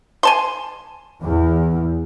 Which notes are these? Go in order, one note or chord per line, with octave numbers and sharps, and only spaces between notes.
G#5 A5 C6
E2